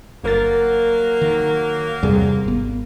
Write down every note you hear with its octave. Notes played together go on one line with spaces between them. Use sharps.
G1 F#3 A#3 A#4 A6
D#3
E2 G2 C3 G3 G#4
G#1 B3